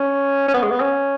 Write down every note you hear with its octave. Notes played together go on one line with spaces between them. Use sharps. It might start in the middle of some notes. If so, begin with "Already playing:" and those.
Already playing: C#4
C#4
B3
G#3
B3
C#4